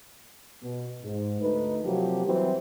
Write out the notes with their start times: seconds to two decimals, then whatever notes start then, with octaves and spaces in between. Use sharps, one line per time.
0.62 B2
1.04 G#2
1.41 D2 A3 D#4 B4
1.83 C3 F3 F#3 A#3 C4 G4
2.25 E3 F#3 G3 C4